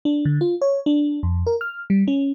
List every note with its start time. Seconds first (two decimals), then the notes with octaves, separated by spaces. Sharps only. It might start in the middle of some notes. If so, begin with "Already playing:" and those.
0.05 D4
0.25 D3
0.41 F4
0.62 C#5
0.86 D4
1.23 F2
1.47 A#4
1.61 F6
1.90 G3
2.08 C#4